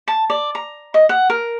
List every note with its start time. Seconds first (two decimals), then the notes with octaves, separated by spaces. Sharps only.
0.08 A5
0.30 D5
0.55 A#5
0.94 D#5
1.09 F#5
1.30 A#4